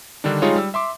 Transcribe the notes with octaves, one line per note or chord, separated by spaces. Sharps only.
D3 D#3 G3 D4
G3 G#3 D#4 F4 G#4 C#5
G3 E6
E5 C6 D6